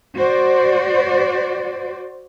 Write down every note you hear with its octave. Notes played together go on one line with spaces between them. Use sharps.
F#4 C5 D5